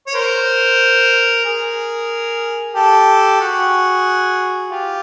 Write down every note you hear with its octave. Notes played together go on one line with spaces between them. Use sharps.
C#5
A#4 C5
G#4 A#4
G4 A4
F#4 G#4
F4 G4